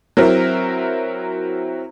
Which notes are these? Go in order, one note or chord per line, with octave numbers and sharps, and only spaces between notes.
F#3 C4 E4 A#4